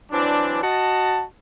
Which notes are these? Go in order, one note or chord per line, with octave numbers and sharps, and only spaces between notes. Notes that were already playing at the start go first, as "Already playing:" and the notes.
E3 F#3 C4 D4
F#4 D#5 A5